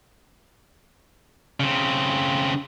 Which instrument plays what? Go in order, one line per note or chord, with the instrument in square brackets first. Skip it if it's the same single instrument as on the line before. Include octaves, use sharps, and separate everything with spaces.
[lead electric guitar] C#3 C4